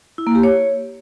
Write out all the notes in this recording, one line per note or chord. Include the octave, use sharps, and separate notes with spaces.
E4
A#3
G4
C#5